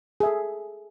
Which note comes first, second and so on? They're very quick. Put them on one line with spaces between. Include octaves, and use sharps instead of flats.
G#4 E5 A4